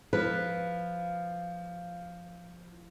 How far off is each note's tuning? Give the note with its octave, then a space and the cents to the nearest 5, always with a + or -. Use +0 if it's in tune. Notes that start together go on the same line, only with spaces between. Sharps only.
F3 +0 B4 +0